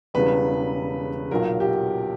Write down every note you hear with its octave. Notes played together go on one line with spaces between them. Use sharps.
E1 E2 C#3 G3 B4
B1 A#2 F#3 A#4
G4